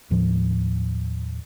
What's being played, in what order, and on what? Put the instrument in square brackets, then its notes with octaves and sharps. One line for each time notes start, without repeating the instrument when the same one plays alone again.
[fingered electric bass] D#2 A2 F3